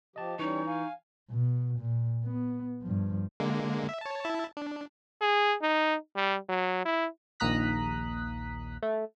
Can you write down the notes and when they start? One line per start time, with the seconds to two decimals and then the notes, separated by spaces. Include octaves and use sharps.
0.16 F3 G4 D#5 A5
0.39 E3 G3 C#4 D#4 C#6
0.67 F5 G#5
1.30 B2
1.79 A#2
2.24 B3
2.82 G2 F3
3.40 D3 G#3 A#3
3.89 E5
4.01 C#5 A5
4.25 E4 E5 A5
4.57 D4
5.21 G#4
5.62 D#4
6.16 G3
6.49 F#3
6.86 E4
7.40 A#1 D#2 A#5 D#6 F#6 B6
8.83 A3